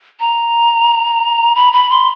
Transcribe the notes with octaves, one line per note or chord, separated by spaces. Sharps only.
A#5
B5
B5
C6